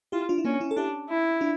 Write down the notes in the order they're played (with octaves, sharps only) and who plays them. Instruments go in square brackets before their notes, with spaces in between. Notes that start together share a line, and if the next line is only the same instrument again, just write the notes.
[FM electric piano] E4 G4 [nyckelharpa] F4
[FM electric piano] D4 F4
E4
[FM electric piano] A#3 D4 [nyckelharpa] C#4
[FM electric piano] C#4 E4
A4
[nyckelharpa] D4 [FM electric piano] E4 G4
[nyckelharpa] E4
[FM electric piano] D4 F4